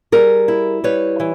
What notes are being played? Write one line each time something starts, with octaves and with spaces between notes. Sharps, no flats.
G3 G#4 A#4
E4
G3 B4 C#5
E3